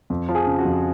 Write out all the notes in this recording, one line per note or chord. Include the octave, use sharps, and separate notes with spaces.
F2
F3
G#4
C#3
F#4
F2